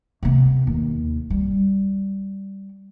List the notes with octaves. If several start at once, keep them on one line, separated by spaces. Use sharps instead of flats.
C3 B3
D#2
G3